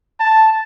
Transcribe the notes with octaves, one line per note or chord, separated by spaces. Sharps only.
A5